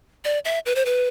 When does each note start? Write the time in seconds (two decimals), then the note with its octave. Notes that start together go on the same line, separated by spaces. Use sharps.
0.25 D5
0.45 E5
0.66 B4
0.75 C5
0.85 B4